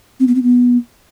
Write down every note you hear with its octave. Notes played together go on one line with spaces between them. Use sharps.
C4
B3
C4
B3